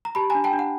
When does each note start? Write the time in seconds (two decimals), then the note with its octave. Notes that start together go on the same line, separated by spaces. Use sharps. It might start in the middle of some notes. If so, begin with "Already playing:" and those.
0.05 A#5
0.15 G4 A5 B5
0.30 D4 G#5 A#5
0.44 G5 A5
0.53 D4
0.59 F#5